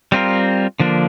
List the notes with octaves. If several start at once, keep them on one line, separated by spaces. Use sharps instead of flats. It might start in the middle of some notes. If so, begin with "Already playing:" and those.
G3 C4 F4 A#4
D3 F3 A#3 D4